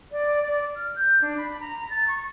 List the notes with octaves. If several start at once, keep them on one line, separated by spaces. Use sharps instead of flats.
D5
D5
F6
G6
D4
B5
A#5
A6
C#6